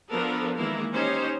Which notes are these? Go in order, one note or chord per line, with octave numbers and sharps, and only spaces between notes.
F3 B3 D4 A4 A#4
D#3 E3 G#3 A#3 E4 A#4
C#4 D#4 G4 C5 C#5